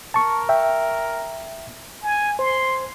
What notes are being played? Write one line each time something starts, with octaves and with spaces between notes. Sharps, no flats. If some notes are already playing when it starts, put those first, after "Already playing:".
A#4 A5 C#6
E5 G5
G#5
C5 C6